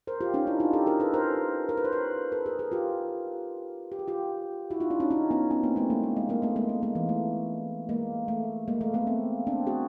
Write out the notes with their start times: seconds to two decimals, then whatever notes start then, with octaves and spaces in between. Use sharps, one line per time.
0.07 A#4 C5
0.21 F4 G4
0.34 C#4 D#4
0.47 D4 E4
0.60 D#4 F4
0.73 G4 A4
0.87 G#4 A#4
1.00 A4 B4
1.14 A#4 C5
1.69 A#4
1.77 B4
1.84 C5
1.92 B4 C#5
2.32 A4 B4
2.46 G#4 A#4
2.59 G#4 A#4
2.72 F4 G4
3.92 G4
3.99 G#4
4.08 F4 G4
4.71 E4 F#4
4.80 D#4 F4
4.90 D4 E4
5.00 C#4 D#4
5.10 C#4 D#4
5.31 B3 C#4
5.51 B3 C#4
5.63 A#3 C4
5.76 A3 B3
5.90 G#3 A#3
6.04 G#3
6.17 G#3
6.29 G#3 A#3
6.42 A3 B3
6.56 G#3 A#3
6.69 A3
6.83 G#3 A#3
6.95 E3
7.09 A3
7.89 G#3 A#3
8.28 A3
8.68 G#3 A#3
8.81 A3
8.94 A3 B3
9.07 A#3 C4
9.47 C4 D4
9.67 F#4 G#4